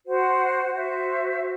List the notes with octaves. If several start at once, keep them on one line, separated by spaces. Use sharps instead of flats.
F#4 C5 F#5
F#4 C5 E5
F#4